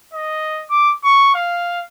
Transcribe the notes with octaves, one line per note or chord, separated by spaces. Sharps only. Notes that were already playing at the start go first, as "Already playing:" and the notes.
D#5
D6
C#6
F5